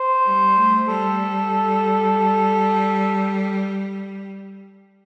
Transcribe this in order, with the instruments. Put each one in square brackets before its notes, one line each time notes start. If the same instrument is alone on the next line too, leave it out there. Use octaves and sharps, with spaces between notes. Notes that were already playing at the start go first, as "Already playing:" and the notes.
Already playing: [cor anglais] C5
[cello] G3
A3
[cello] G3 [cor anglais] A4